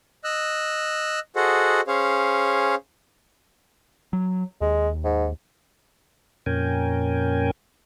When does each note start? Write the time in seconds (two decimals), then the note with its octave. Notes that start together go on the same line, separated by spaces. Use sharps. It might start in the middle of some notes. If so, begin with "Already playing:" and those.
0.24 D#5 E6 F#6
1.36 F#4 G#4 A4 C5 D#5 F#5
1.88 C#4 G#4 C5 C#5 F5
4.13 F#3
4.61 D#2 G#3
5.04 G#2
6.46 F2 A#2 C#4 A#4 G5 G#5